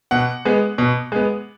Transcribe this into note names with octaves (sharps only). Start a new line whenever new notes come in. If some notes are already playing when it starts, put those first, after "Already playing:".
B2 F#5
G#3 B3
B2
G#3 B3